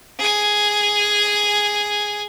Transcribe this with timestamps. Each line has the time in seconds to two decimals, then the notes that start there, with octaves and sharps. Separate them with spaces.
0.19 G#4 G#5